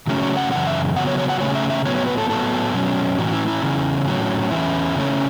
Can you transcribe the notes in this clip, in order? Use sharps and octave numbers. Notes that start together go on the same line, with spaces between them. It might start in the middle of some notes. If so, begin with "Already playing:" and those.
C#3 F#3 A3 C#4
C#5
F#5
F#2 C#3 E3 F#5
E5
C#3 F#3 B3 F#5
C#5
C#5
F#5
C#3 A3 C#4 C#5
E5
E5
A2 F#3 B3 C#5
C#5
B4
A4
A2 F#3 B3 A4
B2 F#3 C#4
A2 E3 C#4 F#4
E4
E4
E2 C#3 C#4
A2 F#3 C#4
E2 E3 C#4 E4
C#3 A3 C#4